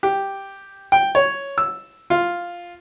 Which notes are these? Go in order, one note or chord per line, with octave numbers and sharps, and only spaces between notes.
G4
G5
C#5
E6
F4